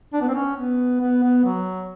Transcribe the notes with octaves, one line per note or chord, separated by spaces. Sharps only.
D4
B3
C4
C#4
B3
B3
B3
F#3